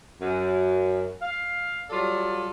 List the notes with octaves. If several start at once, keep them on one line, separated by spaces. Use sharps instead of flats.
F#2
F5
F#3 G3 F4 A4 D5